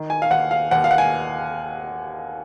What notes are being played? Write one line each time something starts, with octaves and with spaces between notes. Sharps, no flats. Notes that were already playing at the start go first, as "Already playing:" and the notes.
Already playing: D#3
G#5
F5
D#2 F#5
F5
D#2 F#5
F5
F#5
G#5